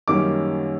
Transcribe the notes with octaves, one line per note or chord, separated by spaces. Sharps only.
F#2 D#3 G3 A#3 C#4 D6